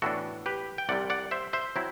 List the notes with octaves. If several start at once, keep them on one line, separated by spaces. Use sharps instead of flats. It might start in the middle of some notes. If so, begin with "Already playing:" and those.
A2 E3 B3 D4 F#4 A4
G4 B4
G5
C2 C3 G3 D5 F#5
D5 F#5
C5 E5
C5 E5
F#3 C4 E4